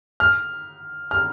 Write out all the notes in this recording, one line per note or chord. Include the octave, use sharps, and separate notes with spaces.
F6
F6